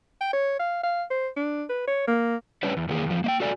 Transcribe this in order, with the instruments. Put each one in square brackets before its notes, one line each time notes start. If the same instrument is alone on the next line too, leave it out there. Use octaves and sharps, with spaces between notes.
[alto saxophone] G5
C#5
F5
F5
C5
D4
B4
C#5
A#3
[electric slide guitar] G3 C#4 D4 B4 C#5
E2
E2 D#3 A#3 G#4
E2 F3
A#3 E5 G5
F#4 A4 D5 G#5